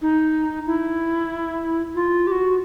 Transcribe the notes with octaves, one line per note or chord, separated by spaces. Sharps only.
D#4
E4
F4
G4
F#4